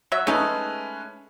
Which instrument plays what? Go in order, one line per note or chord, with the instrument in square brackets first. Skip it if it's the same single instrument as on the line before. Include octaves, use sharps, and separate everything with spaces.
[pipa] F#3 F#4 E5
[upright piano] G#3 C#4 B4 [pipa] A3 D#4 A4